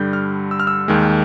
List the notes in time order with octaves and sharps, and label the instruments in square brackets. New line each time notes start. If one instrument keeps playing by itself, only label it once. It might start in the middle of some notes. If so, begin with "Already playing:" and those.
Already playing: [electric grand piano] G2 D3 G3 G6
F6
E6
F6
E6
D#2 D#3 G#3